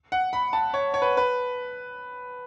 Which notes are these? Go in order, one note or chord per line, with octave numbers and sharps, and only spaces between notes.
F#5
B5
A5
C#5
C#5
B4
B4